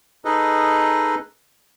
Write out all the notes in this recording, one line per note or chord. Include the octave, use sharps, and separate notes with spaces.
D#4 G#4 A4 B4 D#5